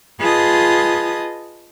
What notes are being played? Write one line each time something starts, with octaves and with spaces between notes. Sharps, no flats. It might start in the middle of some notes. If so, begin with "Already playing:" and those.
F4 G#4 B4 D#5 A5 D#6